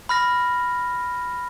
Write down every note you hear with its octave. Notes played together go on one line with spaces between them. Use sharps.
B5 F6 A#6